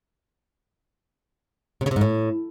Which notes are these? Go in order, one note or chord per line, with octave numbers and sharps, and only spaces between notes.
C3
C#3
C3
G#2
A2